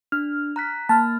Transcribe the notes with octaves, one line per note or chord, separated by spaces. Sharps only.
D4 F6
A#5 F#6 B6
A#3 A5 F6